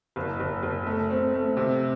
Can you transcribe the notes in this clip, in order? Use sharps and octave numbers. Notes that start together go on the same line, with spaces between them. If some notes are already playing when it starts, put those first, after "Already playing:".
F#1
F#1
F#1
A3
C4
A3
C3